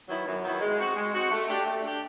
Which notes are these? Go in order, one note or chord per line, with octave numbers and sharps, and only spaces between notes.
D#3 F#3 B3 E4
F#2
D#3 F#3 B3 E4
G#3
C4 D#4 F#4
G#3
C4 D#4 F#4
A3
D4 G4
A3
D4 G4